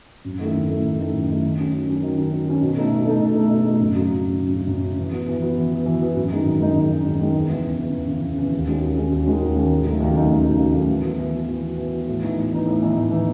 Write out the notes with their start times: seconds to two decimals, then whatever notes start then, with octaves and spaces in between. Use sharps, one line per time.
0.25 F#2
0.39 D#3 A3 E4 A4
0.54 F#2
0.69 D#3 A3 E4 A4
0.83 F#2
0.98 D#3 A3 E4 A4
1.14 F#2
1.28 D#3 A3 E4 A4
1.43 D#3
1.58 F#3 C#4
1.72 D#3
1.88 F#3 C#4
2.02 D#3
2.17 F#3 C#4
2.31 D#3
2.46 F#3 C#4
2.61 B2
2.76 A3 D#4 A4
2.90 B2
3.05 A3 D#4 A4
3.20 B2
3.35 A3 D#4 A4
3.50 B2
3.64 A3 D#4 A4
3.80 F#2
3.94 C#3 F#3
4.09 F#2
4.24 C#3 F#3
4.39 F#2
4.53 C#3 F#3
4.68 F#2
4.83 C#3 F#3
4.97 E3
5.12 B3 F#4
5.28 E3
5.42 B3 F#4
5.57 E3
5.72 B3 F#4
5.86 E3
6.01 B3 F#4
6.16 F#2
6.30 D#3 G#3 D#4
6.45 F#2
6.60 D#3 G#3 D#4
6.75 F#2
6.91 D#3 G#3 D#4
7.05 F#2
7.19 D#3 G#3 D#4
7.34 E2
7.49 C#3 E3
7.64 E2
7.79 C#3 E3
7.94 E2
8.08 C#3 E3
8.23 E2
8.38 C#3 E3
8.53 D#2
8.68 D#3 G#3 C#4 F#4
8.82 D#2
8.97 D#3 G#3 C#4 F#4
9.12 D#2
9.26 D#3 G#3 C#4 F#4
9.41 D#2
9.56 D#3 G#3 C#4 F#4
9.71 D#2
9.85 C#3 F#3 A3 D#4
10.00 D#2
10.15 C#3 F#3 A3 D#4
10.31 D#2
10.45 C#3 F#3 A3 D#4
10.60 D#2
10.75 C#3 F#3 A3 D#4
10.90 E3
11.04 B3 F#4
11.18 E3
11.33 B3 F#4
11.49 E3
11.63 B3 F#4
11.78 E3
11.93 B3 F#4
12.07 A2
12.23 E3 B3 D#4
12.37 A2
12.51 E3 B3 D#4
12.66 A2
12.82 E3 B3 D#4
12.96 A2
13.11 E3 B3 D#4